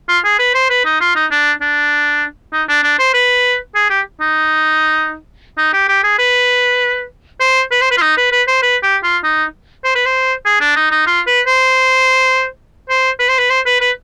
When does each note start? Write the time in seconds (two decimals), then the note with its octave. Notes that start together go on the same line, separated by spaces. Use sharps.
0.09 F4
0.24 G#4
0.39 B4
0.54 C5
0.70 B4
0.85 D#4
1.00 F4
1.15 D#4
1.31 D4
1.61 D4
2.53 D#4
2.68 D4
2.83 D4
2.99 C5
3.14 B4
3.75 G#4
3.90 G4
4.20 D#4
5.57 D#4
5.73 G4
5.89 G4
6.03 G#4
6.19 B4
7.40 C5
7.71 B4
7.81 C5
7.91 B4
7.97 F4
8.02 D#4
8.17 B4
8.32 B4
8.47 C5
8.62 B4
8.83 G4
9.03 F4
9.23 D#4
9.84 C5
9.95 B4
10.06 C5
10.45 G#4
10.61 D4
10.76 D#4
10.91 D#4
11.07 F4
11.27 B4
11.47 C5
12.89 C5
13.19 B4
13.29 C5
13.38 B4
13.50 C5
13.66 B4
13.81 B4